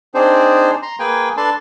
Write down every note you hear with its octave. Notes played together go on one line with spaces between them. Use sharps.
C4 D4 D#4 G#4 C5
A#5 C6
A#3 G#4 B4 G5 G#5
D4 A4 B4 A5 C6